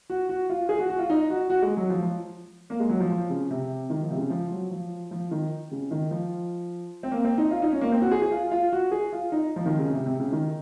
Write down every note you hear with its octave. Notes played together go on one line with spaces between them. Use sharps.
F#4
F#4
F4
G#4
F#4
F#4
F4
D#4
F#4
F#4
G#3
F#3
F3
F3
A#3
G#3
F#3
F3
F3
C#3
C3
D#3
F3
C3
C#3
F3
F#3
F3
F3
D#3
C#3
D#3
F3
C4
A#3
C4
D#4
F4
D#4
C#4
A#3
C4
F#4
G#4
G#4
F4
F4
F#4
G#4
F4
D#4
F3
D#3
C#3
C3
C3
C#3
D#3